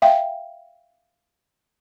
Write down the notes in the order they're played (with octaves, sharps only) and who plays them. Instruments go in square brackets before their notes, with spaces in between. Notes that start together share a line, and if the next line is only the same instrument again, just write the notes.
[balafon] E5 F5 G5